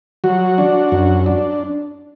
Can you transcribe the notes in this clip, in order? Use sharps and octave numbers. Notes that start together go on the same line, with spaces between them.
F#3 F#4
D4
F#2
D4